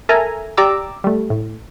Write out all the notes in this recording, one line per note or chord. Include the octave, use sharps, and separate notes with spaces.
A4 A#4 E5 G#5 A#5
G4 D5 A#5 D6 E6
G3 A3
A2